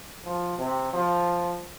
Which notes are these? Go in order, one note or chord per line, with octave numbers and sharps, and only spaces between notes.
F3
C3
F3